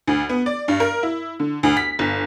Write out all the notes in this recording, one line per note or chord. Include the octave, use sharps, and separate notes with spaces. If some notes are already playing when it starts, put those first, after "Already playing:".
D2
B3
D5
G2
A#4
E4
D3
D2
B6
G1